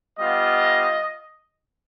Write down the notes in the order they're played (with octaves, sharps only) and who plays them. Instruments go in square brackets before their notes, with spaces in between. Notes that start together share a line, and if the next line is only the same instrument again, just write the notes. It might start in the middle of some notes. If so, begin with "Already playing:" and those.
[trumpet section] G3 B3 F4 D#5